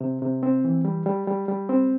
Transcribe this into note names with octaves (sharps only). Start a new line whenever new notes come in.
C3
C3
C4
E3
G3
G3
G3
G3
C4